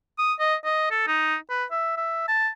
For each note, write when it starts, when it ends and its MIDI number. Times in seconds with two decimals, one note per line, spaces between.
0.18 0.33 87
0.40 0.55 75
0.65 0.90 75
0.91 1.03 69
1.07 1.36 63
1.50 1.64 71
1.71 1.96 76
1.97 2.23 76
2.28 2.49 81